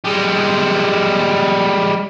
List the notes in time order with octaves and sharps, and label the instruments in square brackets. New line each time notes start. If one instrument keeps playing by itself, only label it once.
[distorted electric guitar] G3 G#3